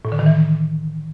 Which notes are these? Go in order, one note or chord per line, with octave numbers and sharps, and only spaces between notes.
A2
D3
D#3
E3